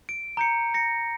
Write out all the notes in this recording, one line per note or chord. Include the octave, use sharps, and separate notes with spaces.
D7
A#5 G6 C#7
A#6 C#7